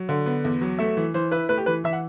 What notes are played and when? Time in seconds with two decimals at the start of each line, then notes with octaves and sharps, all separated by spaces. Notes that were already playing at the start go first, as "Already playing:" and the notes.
Already playing: F#3
0.09 D3
0.26 B3
0.45 E2
0.61 F#3
0.79 A3 E5
0.97 E3
1.14 E3 C5
1.31 E4 B4
1.49 A3 B4
1.58 G4
1.66 E3 B4
1.84 E3 E5
1.93 F#5